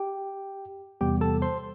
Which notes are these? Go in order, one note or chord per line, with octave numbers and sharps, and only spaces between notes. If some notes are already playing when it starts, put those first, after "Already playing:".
Already playing: G4 G5
E2 C3 E3 G3 B3 G4 G5
A4 A5
C5 C6